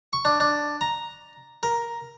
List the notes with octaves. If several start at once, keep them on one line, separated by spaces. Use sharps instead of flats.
C#6
D4
D4
A#5
A#4